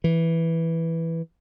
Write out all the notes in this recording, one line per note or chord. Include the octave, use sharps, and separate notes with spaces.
E3